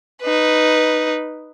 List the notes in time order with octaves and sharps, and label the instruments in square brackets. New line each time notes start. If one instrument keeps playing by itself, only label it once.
[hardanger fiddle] D#4 B4